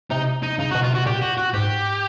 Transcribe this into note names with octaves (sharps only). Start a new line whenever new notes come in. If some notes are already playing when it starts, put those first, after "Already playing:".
C3 D#4
D#4
C#3 D#4
F#4
B2
F4
C3 F#4
A#2 G4
F#4
F#4
G#2 G4